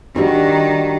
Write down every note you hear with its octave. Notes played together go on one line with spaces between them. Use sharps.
D#3 G3 D4 F#4 C#6